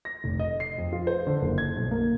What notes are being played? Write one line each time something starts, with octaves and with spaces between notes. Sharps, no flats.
A#6
F1
D#5
C7
F2
F4
C5
D3
F#1
G#6
B1
A#3